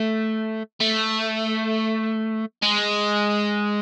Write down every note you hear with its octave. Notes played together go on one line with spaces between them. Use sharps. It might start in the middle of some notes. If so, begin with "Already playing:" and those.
Already playing: A3
A3
G#3